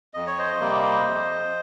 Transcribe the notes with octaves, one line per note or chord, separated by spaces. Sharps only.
F2 D#5
C#5
C5 D#5
C3 G3 A#3
F2